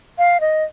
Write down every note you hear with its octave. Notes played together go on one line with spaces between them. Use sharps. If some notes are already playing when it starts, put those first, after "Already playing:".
F5
D#5